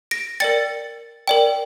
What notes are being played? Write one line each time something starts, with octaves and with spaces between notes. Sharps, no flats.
A#6 D7
A#4 D5 G5 A6 C#7
A#4 D5 G5